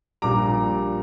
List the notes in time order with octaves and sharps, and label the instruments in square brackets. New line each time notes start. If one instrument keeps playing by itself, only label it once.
[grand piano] A#1 A#2 G3 A#5 D6